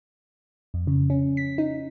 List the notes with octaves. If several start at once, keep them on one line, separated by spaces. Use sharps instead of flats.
F2
C#3
C#4
B6
D#4